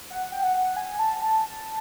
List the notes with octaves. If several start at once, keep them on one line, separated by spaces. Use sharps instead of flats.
F#5
G5
F#5
G#5
A5
A5